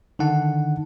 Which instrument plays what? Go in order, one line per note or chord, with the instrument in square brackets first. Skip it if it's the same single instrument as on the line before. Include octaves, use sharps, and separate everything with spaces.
[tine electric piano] D3 D#3 D#4 F#5 A5